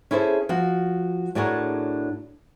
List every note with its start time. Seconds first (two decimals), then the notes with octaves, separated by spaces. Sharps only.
0.11 C#4 E4 G#4 A4 C5
0.49 F3 F#4
1.35 A2 D4 F#4 G#4 A#4 C#5